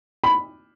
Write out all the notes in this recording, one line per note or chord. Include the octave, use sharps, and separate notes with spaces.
B5